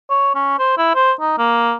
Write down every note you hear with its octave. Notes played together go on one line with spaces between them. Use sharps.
C#5
C#4
C5
E4
C5
D#4
A#3